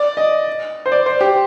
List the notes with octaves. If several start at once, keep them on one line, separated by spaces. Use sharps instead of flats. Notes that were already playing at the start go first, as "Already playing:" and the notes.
Already playing: D5
D#5
C5
D5
C5
G4